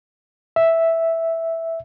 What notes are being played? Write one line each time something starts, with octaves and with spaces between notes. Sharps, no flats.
E5